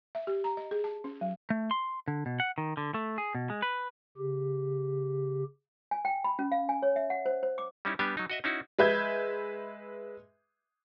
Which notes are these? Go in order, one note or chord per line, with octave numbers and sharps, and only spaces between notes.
E5
G4
A#5
D#5
G#4
A5
C#4
F#3
A3
C6
D3
B2
F#5
D#3
D3
A3
G#4
B2
G#3
B4
C#3 G4
G#5
G5
B5
C#4
F5
G#5
C#5
E5
F#5
C5
C5
D6
G3 C#4 D#4 E4
G3 B3 D4 G4 G#5
F#3 D#4
F#4 D#5 E5
C#4 D#4 E4 F#4
G#3 B4 E5 G6 G#6